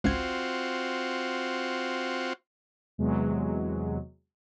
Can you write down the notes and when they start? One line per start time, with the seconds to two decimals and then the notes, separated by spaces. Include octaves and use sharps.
0.04 G#1 C#2 C4 F4 F#4 G#6
2.98 E2 C3 F#3 G#3